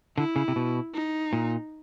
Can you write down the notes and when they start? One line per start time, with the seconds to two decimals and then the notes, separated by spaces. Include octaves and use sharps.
0.17 D3 E4
0.36 C#3
0.48 C3
0.56 B2
0.94 D#4
1.33 A#2